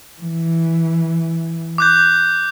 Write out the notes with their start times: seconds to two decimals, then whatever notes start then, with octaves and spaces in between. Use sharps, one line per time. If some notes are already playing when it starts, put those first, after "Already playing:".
0.21 E3
1.78 D6 F#6 G6